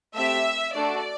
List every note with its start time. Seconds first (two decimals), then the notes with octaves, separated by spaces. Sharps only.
0.14 A3 C4 G4 E5
0.74 A3 D4 F#4 A4 D5